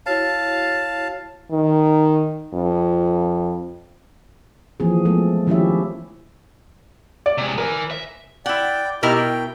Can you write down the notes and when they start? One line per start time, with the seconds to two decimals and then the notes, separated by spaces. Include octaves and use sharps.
0.06 E4 F#4 C#5 F5 A5
1.51 D#3
2.54 F2
4.80 E3 F3 A#3 C4 G#4
5.05 F3 G#3 A3 B3 A4
5.47 D#3 F3 C#4 E4 G4 E5
7.26 D5
7.38 C3 G#3
7.58 A#4 B4 G#5
7.91 E5
8.46 E4 D5 F#5 G5
9.03 B2 D#4 E4 G4 A#4 F6
9.15 G5